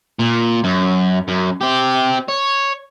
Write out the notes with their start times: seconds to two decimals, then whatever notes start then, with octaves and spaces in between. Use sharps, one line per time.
0.19 A#2
0.64 F#2
1.28 F#2
1.61 C4 G4
2.29 C#5